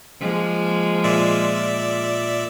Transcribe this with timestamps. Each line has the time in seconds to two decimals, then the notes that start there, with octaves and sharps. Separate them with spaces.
0.20 F3 G#3 A#3
1.04 A#2 D5 E5